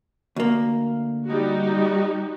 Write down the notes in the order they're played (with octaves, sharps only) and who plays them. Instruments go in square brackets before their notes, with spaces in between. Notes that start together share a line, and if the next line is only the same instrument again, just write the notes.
[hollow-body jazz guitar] D2 A#3
[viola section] G3 D#4 F#4